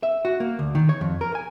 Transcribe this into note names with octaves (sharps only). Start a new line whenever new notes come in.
E5
F#4
A#3
D2
D#3
C#5
F2
A#4
G#5